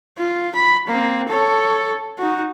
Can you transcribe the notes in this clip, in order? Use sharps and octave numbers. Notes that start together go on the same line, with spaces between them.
F4
B5
A#3 C4
A4 C#5
D#4 F#4